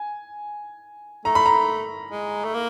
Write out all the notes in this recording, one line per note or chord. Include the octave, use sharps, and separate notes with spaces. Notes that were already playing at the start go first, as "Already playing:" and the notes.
Already playing: G#5
A3 A#5
B5
A#5
G#3
A3
A#3